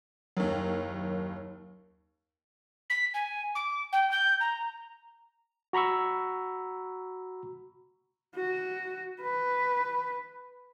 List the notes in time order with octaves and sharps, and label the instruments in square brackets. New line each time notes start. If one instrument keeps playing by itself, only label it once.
[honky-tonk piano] F#1 D#2 [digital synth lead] F#3
[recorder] B6
G#5
D6
G5
G6
A#5
[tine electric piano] F#4 A#5 B5 C#6 E6
[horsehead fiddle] F#4
B4